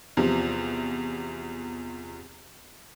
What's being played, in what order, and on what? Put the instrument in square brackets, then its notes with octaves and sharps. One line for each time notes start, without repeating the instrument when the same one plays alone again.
[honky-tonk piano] E2 C3 F3